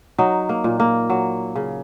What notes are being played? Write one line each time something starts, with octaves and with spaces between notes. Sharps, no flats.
F#3 D#4
A#3
A#2
A#3
F#3
C#3